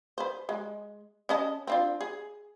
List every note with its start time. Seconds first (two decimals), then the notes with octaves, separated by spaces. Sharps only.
0.18 B4 C5
0.49 G#3
1.29 C#4 D#5 A5
1.67 C4 D4 F4
2.01 G#4